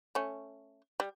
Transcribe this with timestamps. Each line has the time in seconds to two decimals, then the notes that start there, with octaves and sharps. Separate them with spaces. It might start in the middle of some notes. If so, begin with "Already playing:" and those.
0.15 A3 C#4
1.00 G3